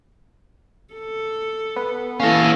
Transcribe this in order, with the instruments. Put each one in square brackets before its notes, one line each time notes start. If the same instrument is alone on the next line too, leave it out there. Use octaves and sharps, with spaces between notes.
[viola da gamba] A4
[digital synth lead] B3
[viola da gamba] A#3 E4 [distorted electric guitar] C#4 A4 [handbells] F5 A#6